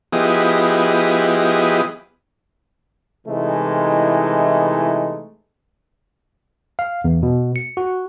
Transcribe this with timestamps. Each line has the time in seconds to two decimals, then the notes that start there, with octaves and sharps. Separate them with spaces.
0.13 F3 B3 E4 G4 G#4 D#5
3.27 C3 E3 G#3 A3 D#4 E4
6.79 F5
7.04 E2
7.23 B2
7.56 C#7
7.77 F#4